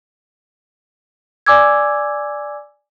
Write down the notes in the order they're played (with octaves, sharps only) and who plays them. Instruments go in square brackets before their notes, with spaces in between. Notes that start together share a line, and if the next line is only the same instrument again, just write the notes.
[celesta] D5 G#5 D6 E6 G#6